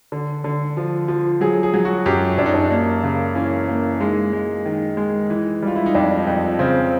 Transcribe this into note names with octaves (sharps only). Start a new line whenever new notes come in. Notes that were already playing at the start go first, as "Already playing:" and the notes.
D3
D3
F3
F3
F#3 G#4
G#4
F#3
F#4
F#2 G4
F#2 D4
D#4
D4
A#3
C#3
E3 C#4
A#3
G#3 D#4
G#3
D#3
G#3
E3
G3 F4
E4
D#4
F2 D4
F2
C#3 C4